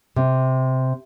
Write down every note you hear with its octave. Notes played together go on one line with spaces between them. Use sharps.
C3